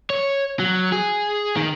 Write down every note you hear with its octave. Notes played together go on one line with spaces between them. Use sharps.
C#5
F#3
G#4
D#3